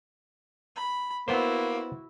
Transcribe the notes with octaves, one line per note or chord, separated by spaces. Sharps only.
B5
A#3 B3 E4 F#4 C5